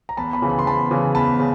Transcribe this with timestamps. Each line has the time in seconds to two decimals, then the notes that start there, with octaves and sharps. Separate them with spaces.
0.09 A#5
0.17 E2 A5 B5
0.33 A5 B5
0.42 C#3 E3
0.50 B5
0.59 C6
0.66 E2 A5 B5
0.91 C#3 E3
1.15 E2 A5 B5
1.39 C#3